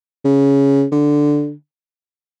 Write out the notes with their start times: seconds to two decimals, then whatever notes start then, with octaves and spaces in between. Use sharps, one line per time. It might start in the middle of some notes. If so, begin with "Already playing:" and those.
0.25 C#3
0.92 D3